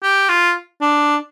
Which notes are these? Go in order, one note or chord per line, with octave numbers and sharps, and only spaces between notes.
G4
F4
D4